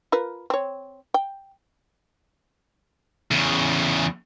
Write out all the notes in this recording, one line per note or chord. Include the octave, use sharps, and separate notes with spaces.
F4 A#4 B4
C4 C#5
G5
E2 C#3